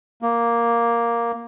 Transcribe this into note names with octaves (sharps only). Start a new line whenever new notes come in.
A#3